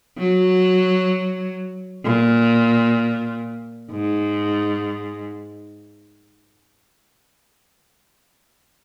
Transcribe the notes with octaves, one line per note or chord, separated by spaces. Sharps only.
F#3
A#2
G#2